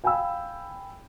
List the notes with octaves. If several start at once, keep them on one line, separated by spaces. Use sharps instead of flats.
F5 G5 G#5 B5 E6